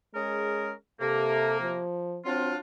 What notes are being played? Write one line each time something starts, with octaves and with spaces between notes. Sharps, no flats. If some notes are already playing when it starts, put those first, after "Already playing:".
G#3 C#4 G#4 A#4
C3 A#3 A4
F3
F#3 C4 D4 F4